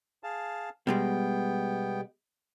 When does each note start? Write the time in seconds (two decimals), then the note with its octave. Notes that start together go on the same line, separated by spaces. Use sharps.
0.23 G#4 F5 A5
0.87 B2 G3 G#3 B3 G5